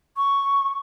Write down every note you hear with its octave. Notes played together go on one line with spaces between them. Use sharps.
C#6